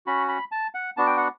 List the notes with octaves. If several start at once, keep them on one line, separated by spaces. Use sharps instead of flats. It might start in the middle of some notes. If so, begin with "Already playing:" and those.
C#4 F#4 B5
B5
A5
F#5
B3 D4 F#4 A5
G5
F#5